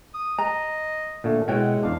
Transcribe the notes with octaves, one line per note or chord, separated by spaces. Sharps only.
D#6
D#5 A#5
A#2 D3 A3
B2 G#3 E4 C#5 F#5 G5
E2 D4 F5